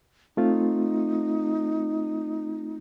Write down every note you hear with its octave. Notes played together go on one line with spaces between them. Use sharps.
A3 C4 D#4 F4